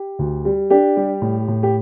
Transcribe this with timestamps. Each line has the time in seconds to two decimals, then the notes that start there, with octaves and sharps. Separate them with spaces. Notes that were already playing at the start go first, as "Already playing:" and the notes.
Already playing: G4
0.19 D2
0.45 G3
0.70 D4 G4
0.97 G3
1.21 A2
1.48 A2
1.63 G4